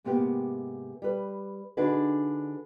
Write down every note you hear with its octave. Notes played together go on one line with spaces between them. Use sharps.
G#2 C3 A#3 B3 G4
G3 B4
D3 D4 D#4 F#4 G#4 B4